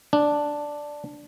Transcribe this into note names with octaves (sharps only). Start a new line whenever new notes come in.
D4